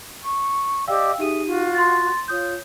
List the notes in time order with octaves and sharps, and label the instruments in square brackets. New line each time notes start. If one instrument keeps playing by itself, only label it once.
[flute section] C#6
[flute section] G4 D5 D#5 [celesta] F5 G5 E6
[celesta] D#4 G4 D#7 [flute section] G#4 E5
[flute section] F4 F#4
[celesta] C6 A6
[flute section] F4 [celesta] C#5 D#6 G6